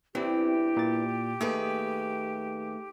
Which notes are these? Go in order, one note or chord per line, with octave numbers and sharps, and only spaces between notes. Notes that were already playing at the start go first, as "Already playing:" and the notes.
E2 G2 E3 C4 E4 G4
A#2 A6
D#2 A3 G#4 B4